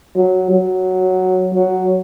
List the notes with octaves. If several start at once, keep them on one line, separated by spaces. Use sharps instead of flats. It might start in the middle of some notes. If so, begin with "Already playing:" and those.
F#3
F#3
F#3